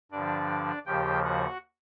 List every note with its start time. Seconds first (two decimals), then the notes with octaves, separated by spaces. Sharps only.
0.11 G2 D3 F3 D4 D5
0.86 D#2 C#3 F3 G4 G5
1.24 F#4 F#5